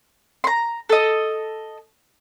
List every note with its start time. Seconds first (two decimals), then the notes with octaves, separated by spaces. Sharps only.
0.44 A#5 C6
0.89 A4 D#5